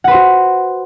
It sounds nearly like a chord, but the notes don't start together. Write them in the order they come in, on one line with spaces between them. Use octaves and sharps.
F#5 B4 C5 F#4